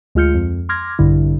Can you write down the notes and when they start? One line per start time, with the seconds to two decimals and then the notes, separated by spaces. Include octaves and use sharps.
0.15 D2 G#3 F4 F6 G6 C#7
0.35 F2
0.69 C6 D6 F6 G#6 A#6
0.99 A#1 G2 D3 E4